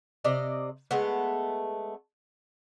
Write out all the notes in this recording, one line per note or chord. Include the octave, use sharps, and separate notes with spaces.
C3 D5 D#5
G#3 A3 B3